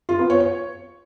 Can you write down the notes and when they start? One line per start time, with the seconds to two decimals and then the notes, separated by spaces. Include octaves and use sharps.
0.09 F4
0.19 B3
0.30 C#5
0.40 C#5